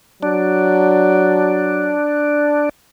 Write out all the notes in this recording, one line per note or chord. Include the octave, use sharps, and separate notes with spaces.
F#3 D4